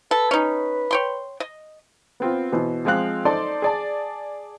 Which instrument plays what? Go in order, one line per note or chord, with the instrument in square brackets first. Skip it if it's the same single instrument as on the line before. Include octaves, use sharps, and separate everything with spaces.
[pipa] A4 [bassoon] B4
[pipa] C#4 D#4
C#5 G5 C6
D#5
[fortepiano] B3 C4 F4
B2 E3 C5
F3 G#3 C4 F5 F#6
D#4 A4 C5 D5 A5 C6
G#4 D5 A5